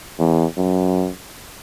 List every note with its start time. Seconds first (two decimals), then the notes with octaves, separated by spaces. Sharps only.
0.19 E2
0.57 F#2